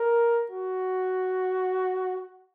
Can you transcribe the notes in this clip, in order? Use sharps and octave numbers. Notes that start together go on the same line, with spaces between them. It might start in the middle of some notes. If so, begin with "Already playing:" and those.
Already playing: A#4
F#4